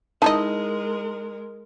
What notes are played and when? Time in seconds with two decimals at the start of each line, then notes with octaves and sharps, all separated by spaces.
0.22 G#3 D#4 E4 A#4 D#5 A5